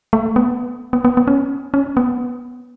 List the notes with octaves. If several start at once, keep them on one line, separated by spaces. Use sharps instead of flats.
A3
B3
B3
B3
B3
C#4
C#4
B3